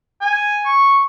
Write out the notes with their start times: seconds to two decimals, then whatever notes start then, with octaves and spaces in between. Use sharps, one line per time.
0.21 G#5
0.65 C#6